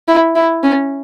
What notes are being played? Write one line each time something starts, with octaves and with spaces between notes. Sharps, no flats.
E4
E4
C#4